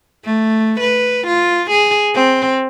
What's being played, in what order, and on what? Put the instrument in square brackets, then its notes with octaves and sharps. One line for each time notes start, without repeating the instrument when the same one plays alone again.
[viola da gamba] A3
B4
F4
G#4
C4